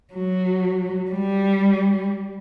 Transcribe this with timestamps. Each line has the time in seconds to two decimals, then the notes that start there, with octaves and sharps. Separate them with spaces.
0.14 F#3
1.11 G3